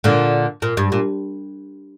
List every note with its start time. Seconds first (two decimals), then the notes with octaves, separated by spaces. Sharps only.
0.04 A#2 D3
0.62 A#2
0.77 G2
0.92 A#2